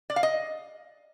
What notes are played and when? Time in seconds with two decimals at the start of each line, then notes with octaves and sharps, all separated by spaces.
0.10 D5
0.16 F5
0.23 D#5